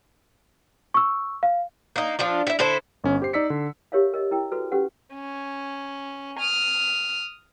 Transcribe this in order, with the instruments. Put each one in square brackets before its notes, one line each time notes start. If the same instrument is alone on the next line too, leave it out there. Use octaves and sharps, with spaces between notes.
[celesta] C#6 E6
F5
[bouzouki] A#3 D#4
F3 D4 F4
E4 E5
D3 E4 A4 C5
[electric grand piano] G1 C#4
G4 C5 C7
D#4 D5 E6 B6 C#7
D3
[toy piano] G4 A#4 C#5 E5 F5
A#4 D#5
E4 A#4 G5
F#4 A4 B4
C#4 G4 A4 B4 F#5
[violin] C#4
D#6 F6